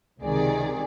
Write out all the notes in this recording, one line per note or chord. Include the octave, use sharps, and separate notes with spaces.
C#2 C3 D#3 G#4 D5